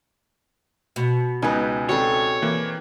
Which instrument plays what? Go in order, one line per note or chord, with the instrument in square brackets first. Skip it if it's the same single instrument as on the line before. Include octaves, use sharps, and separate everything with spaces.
[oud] B2
[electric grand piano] C#2 B3 G#5 [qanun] D#4 B4
[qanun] G3 C4 A4 [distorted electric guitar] C#5
[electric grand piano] E3 A#3